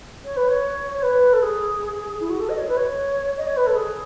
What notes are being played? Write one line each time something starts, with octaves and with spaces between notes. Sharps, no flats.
C#5
B4
C#5
C#5
B4
A4
G#4
E4
F#4
A4
D#5
C#5
B4
C#5
D#5
C#5
B4
A4
G#4